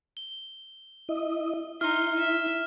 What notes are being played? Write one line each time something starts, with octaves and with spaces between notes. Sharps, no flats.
G7
E4 D#5
D#4 E4 C6 F6
E5